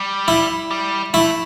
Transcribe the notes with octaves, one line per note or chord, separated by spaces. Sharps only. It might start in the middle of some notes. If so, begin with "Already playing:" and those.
Already playing: G3
E4
G3
A3 E4